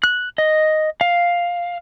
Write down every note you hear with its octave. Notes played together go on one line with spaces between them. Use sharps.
F#6
D#5
F5